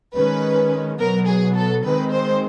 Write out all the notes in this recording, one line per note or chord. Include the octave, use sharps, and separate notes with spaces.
D#3 G#3 C#4 B4
B2 F#3 B3 A#4
G#4
A4
D#3 G#3 C4 B4
C5